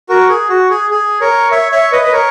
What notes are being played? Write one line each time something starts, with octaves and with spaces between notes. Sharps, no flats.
F#4 A#4
G#4
F#4
G#4
G#4
A#4 C#5
C#5 E5
C#5 E5
B4 D#5
B4
A#4 C#5